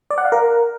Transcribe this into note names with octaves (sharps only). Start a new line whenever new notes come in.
D5
F#5
F5
A#4